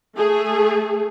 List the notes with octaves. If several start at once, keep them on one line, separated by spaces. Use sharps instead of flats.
A3 G#4